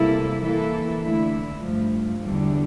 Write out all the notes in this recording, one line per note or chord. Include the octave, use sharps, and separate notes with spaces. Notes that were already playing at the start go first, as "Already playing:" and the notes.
Already playing: C3 G3 A#3 E4 A4
E3 A#3 E4 A4
D3 A3 E4
G2 F3 A3
E2 D3 G3